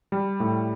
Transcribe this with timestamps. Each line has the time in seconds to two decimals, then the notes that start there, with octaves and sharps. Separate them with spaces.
0.12 G3
0.40 A2